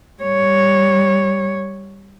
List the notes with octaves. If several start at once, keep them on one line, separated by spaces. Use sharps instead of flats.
G3 C#5